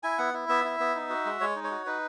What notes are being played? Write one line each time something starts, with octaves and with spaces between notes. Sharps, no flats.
E4 G#5
B3 F#5
E4
B3 E5
E4
B3
D#4
F#4
G#3
G#3 C#5
D#4
C#5
F#4
D#4 B4